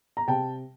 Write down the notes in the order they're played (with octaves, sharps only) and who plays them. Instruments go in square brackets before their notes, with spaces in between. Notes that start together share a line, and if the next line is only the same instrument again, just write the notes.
[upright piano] A#5
C3 G5 A5